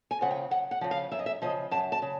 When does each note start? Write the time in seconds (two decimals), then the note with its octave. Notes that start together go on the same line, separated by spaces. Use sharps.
0.11 G#5
0.21 C#3 F3 F#5
0.31 G5
0.51 F#2 F#5
0.71 F#5
0.81 C#3 F3
0.91 F5
1.12 F#2 E5
1.19 D#5
1.26 E5
1.42 C#3 F3 D#5
1.71 F#2 A5
1.92 A5
2.02 C#3